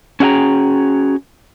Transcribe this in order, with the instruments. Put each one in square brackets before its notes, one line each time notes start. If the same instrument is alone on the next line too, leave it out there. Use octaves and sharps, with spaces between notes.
[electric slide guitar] C#4 F#4 G#4 E5 G5 A#5